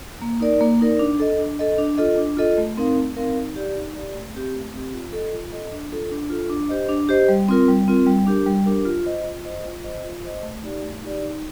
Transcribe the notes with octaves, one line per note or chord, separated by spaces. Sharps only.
A#3
D#4 A#4 D5
A#3
D#4 A#4 D5
D4
A4 D#5
D4
A4 D#5
D4
F4 A4 D#5
D4
F4 A4 D#5
A3
C4 D#4 A#4 F5
A3
C4 D#4 A#4 F5
D#4
G4 D5
D#4
G4 D5
A3
C4 G4
A3
C4 G4
F4
A4 D#5
F4
A4 D#5
D4
F4 A4
D4
F4 A4
D4
G4 C5 D#5
D4
G4 C5 D#5
G3
C4 F4 A#4
G3
C4 F4 A#4
G3
D4 G4 A#4
G3
D4 G4 A#4
F4
C5 D#5
F4
C5 D#5
F4
C5 D#5
F4
C5 D#5
A3
D#4 G4 D5
A3
D#4 G4 D5
D#4